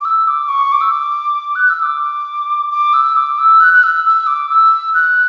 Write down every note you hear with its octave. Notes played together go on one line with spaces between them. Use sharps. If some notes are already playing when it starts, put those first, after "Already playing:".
D6
E6
D6
C#6
D6
E6
D6
F#6
E6
D6
D6
E6
D6
E6
F#6
F#6
E6
E6
D6
E6
F#6